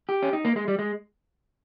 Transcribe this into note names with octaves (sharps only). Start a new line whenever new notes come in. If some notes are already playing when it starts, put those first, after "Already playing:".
G4
C#4
D#4
A#3
G#3
G3
G#3